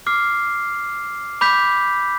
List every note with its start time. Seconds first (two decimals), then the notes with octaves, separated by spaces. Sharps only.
0.07 D6 F6 C7
1.41 B5 D6 G6 B6